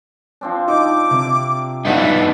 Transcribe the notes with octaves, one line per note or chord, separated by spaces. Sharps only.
F3 C4 D4
D#4 D6
C3
G2 B3 D4 D#4 E5 F#5